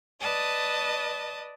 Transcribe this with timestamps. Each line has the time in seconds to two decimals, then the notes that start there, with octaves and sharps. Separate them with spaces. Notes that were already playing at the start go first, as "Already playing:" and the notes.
0.20 B4 D5 D#5 A5 D#6